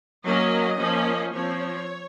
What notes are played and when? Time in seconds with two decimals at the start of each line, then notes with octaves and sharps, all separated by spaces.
0.25 F#3 A#3 C#4 D#5
0.79 F3 A#3 C#4
1.33 F3 C4 C#5